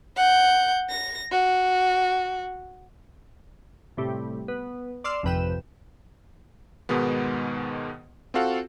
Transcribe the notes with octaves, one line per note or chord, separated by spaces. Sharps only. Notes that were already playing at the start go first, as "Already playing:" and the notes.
F#5 G6
A#6
F#4
A2 C3 G3 A3
B3
D5 C6 E6 F6
G#1 F2 C3 B4 G5 E7
G#2 B2 D#3 G#3 B3
C4 F4 F#4 A4 F5 F#5